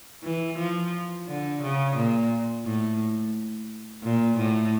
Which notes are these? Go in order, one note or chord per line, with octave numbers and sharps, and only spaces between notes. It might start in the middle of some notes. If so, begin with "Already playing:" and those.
E3
F3
D3
C#3
A#2
A2
A#2
A2